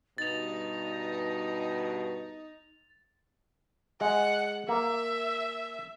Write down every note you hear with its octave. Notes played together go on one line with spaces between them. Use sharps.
G2 B2 D#4 A6 F7
G#3 F#5
A#3 E5